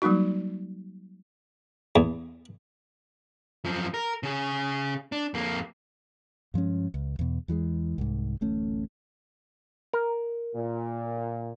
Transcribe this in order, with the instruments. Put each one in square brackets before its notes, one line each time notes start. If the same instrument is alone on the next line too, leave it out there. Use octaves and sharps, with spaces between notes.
[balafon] F#3 G3 A#3 D#4 F#4
[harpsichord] E2
[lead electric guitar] F#2 F3
A#4
C#3 G#4
D4
F2 A#3
[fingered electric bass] G2 F3 G#3 C#4
C#2
E2 B2
E2 E3 F#3 G#3
C2 G#2
D1 A1 A3 C#4
[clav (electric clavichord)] A#4
[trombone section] A#2